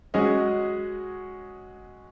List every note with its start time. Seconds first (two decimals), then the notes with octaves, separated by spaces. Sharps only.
0.14 F#3 G#3 C#4 F#4 G#4 D#5